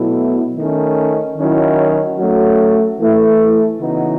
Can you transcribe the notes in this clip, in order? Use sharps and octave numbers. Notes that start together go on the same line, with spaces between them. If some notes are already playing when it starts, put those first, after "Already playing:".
Already playing: B2 F#3 A3 E4
D#3 A3 C#4
D#3 F#3 C#4 E4
F#3 A3 C#4 F#4
E3 A3 E4
C#3 E3 B3 D#4 F#4